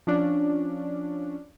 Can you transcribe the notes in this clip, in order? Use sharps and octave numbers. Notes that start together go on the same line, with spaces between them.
F3 C#4 D4